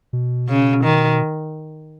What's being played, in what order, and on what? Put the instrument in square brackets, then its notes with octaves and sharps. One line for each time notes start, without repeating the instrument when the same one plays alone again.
[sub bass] B2
[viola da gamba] C#3
D#3